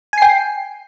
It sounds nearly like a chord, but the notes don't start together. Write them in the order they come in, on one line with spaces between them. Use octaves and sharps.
G#5 C7 G5